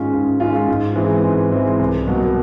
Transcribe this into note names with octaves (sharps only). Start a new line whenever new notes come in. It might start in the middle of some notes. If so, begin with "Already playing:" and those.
Already playing: G#2 D#3 G#3 C#4 F4
G#2
D#3 G#3 C#4 F4
G#2
E3 G#3 C4
G#2
E3 G#3 C4
C2
B2 F#3 A#3